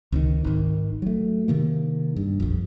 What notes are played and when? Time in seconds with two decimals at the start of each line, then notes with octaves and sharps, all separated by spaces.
0.12 C#2 C3 D#3
0.44 G#1 D#3
1.02 F#3 A3
1.48 C3 D#3 A#3
2.16 G2
2.40 A#1 F2